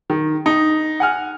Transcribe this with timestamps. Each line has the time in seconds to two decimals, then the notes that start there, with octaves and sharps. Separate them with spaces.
0.10 D#3
0.46 D#4
1.00 F#5 G#5 F6